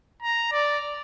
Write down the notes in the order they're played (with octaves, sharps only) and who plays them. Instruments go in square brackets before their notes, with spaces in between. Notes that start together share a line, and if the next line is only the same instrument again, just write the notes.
[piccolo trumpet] A#5
D5